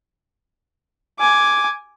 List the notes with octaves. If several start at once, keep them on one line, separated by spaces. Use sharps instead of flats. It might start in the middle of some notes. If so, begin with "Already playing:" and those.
G#5 D6